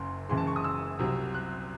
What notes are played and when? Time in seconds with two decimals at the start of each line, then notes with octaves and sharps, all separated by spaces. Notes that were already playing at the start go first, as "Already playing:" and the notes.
Already playing: F#1 F#2 C6
0.29 F#1 F#2 E3 G#3 C6
0.37 A5
0.47 C#6
0.56 D#6
0.64 E6
0.99 C2 C3 F#3
1.34 F#6